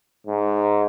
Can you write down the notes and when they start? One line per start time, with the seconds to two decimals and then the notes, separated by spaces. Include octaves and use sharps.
0.27 G#2